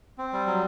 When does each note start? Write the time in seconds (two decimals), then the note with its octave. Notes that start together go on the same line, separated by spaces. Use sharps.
0.18 C4
0.33 G3
0.47 F#3